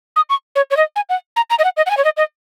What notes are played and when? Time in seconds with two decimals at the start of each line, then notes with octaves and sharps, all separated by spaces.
0.16 D#6
0.30 C#6
0.56 C#5
0.71 C#5
0.77 D#5
0.96 G#5
1.09 F#5
1.36 A#5
1.50 A#5
1.59 D#5
1.64 F#5
1.77 D#5
1.86 F#5
1.90 G#5
1.97 C#5
2.05 D#5
2.17 D#5